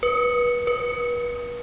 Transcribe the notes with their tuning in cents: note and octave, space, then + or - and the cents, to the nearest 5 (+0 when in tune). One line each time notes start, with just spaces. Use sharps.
B4 -30
B4 -35